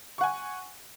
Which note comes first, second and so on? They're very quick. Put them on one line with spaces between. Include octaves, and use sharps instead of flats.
C#6 F#5 G#5